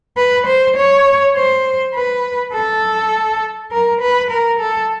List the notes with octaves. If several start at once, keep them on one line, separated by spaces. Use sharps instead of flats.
B4
C5
C#5
C5
B4
A4
A#4
B4
A#4
A4